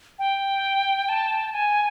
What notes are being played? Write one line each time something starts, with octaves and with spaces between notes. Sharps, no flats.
G5
A5
G#5